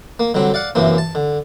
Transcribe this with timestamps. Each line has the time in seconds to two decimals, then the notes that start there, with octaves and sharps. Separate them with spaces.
0.20 A#3
0.34 D3 F#3 G3 C4
0.54 D5 F5 F#5
0.75 F#2 C3 E3 A#3
0.98 A5
1.15 D3